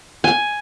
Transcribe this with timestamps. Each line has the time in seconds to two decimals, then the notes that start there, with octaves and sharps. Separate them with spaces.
0.24 G#5